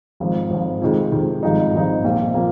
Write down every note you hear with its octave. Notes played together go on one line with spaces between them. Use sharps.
G#1 G#2 F3
G#1 G#2 F3
F2 C3 D#3 G#3
F2 C3 D#3 G#3
G#1 G2 F3 G#3 D#4
G#1 G2 F3 G#3 D#4
A#1 A#2 F3 A#3
A#2 F3 A#3